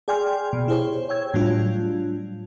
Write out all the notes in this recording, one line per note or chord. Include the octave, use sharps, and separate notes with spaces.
G#4 D5 G5 G#5 C6 F6
B2
E4 G4 G#4 C5 C#5
C#5 G5 E6 G#6
A2 F#3 G3 D4 F4